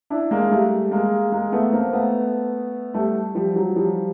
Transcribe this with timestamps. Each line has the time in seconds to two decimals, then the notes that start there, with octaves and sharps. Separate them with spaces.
0.10 D4 E4
0.31 G#3 A#3
0.51 G3 A3
0.91 G#3 A#3
1.32 G#3 A#3
1.52 A3 B3
1.73 A#3 C4
1.93 A3 B3
2.94 G3 A3
3.35 F3 G3
3.56 F#3
3.76 F3 G3